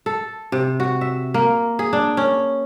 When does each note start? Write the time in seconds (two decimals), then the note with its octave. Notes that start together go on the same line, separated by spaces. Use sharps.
0.06 A4
0.52 C3
0.80 F#4
1.01 E5
1.34 A#3
1.79 G#4
1.93 D4
2.17 C#4